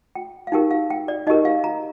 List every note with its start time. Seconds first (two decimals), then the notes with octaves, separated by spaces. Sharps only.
0.15 G5
0.47 F5
0.52 D#4 G4 A#4 G5
0.71 F5
0.90 G5
1.08 D5
1.27 D#4 G4 A#4 D#5
1.45 F5
1.64 A#5